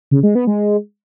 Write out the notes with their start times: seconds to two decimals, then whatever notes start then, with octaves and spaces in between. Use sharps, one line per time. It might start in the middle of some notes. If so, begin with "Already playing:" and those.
0.11 C#3
0.23 G#3
0.35 B3
0.47 G#3